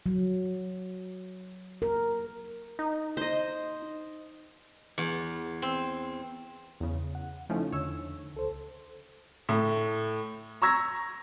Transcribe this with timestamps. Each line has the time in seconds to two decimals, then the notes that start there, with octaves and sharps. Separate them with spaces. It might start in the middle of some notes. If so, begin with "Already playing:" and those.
0.06 F#3
1.82 A#4
2.79 D#4
3.17 C5 D#5
4.98 E2
5.62 C4
6.80 E2 C#3
7.15 F#5
7.50 C#3 F3 A3 C#4 D#4 E4
7.72 E2 D3 C#5 E6
8.34 C#2 A4 C5
9.49 A2 A3
10.62 A#5 C#6 E6 G#6 A#6